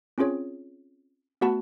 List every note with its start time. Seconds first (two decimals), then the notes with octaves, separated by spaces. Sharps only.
0.18 C4 C#4 F4 G#4 C#5
1.41 A3 B3 F#4 F#5 A5 B5